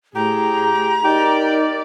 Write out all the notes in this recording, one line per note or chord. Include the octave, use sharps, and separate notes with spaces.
A2 G4 G#4 A#5
D#4 G4 A#4 D5